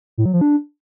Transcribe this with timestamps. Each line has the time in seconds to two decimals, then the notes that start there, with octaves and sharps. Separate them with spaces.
0.18 A2
0.25 F#3
0.33 F3
0.41 D4